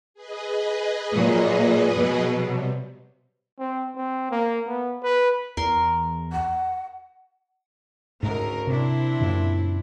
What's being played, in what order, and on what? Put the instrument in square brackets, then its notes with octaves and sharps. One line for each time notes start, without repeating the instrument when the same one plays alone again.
[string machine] G#4 B4 D#5
[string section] A#2 F#3
B2 F#3
[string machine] C3 G3
[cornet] C4
C4
A#3
B3
B4
[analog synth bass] E2 [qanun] A#4 C6
[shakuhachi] F#5
[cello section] D2 C#3 A#4 [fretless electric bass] G#2
[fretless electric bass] C3 [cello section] C4 D4 E4
[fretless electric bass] F#2 A#2 C#3